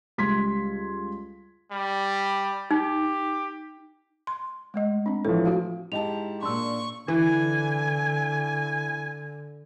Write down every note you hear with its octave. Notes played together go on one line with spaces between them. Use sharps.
C#2 G3 C6 G#6 B6
G3
D#4 G4
C6
G#3 A3 D#5
C4 D4
A2 E3 F3 A4
F4 F#4 F5
G#2 E4 G4 D#5 A5 F7
A#2 D4 C6 C#6 E6
D3 E3 G#5